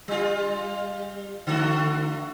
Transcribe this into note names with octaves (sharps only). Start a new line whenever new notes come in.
G3 F4
D3 A3 F#4